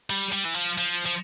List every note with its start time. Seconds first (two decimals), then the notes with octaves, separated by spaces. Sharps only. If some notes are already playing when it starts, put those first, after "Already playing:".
0.10 G3
0.33 G3
0.45 E3
0.55 F3
0.78 F3
1.06 F3